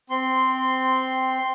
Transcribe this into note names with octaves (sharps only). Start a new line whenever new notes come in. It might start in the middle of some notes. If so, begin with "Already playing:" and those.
C4 C6